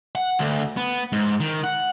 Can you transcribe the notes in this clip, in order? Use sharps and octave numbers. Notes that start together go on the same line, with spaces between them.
F#5
D2
B3
G#2
D#3
F#5